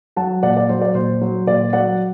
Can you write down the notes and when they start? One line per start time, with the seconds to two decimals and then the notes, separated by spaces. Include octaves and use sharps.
0.16 F#3 F#5 A5
0.43 A#2 D5 F#5
0.57 D5
0.69 F#3 C5
0.81 D5
0.95 A#2 C5
1.21 F#3
1.47 A#2 D5
1.73 F#3 D5 F#5